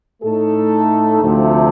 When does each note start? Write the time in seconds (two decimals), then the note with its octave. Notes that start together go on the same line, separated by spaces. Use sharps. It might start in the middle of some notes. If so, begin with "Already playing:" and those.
0.22 A2 A3 D#4 A4
1.21 D2 C3 F3 A3